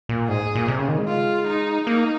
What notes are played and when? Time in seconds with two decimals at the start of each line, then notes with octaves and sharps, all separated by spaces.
0.09 A#2
0.28 G#2 G#4
0.55 A#2
0.68 C3
0.78 C#3
0.88 D#3
0.98 G#3
1.08 F4
1.47 D#4
1.87 A#3 D#4